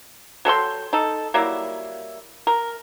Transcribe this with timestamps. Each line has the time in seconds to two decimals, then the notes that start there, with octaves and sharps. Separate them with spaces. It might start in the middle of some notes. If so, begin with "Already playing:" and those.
0.45 F#3 A4 G5 C6
0.93 D#4 A4
1.34 F#3 G3 A#3 E4
2.47 A#4